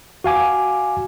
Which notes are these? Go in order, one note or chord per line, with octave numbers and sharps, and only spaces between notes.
F#4 F5 G#5 D6